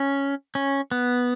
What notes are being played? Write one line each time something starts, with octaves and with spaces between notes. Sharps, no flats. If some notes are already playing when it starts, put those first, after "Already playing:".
Already playing: C#4
C#4
B3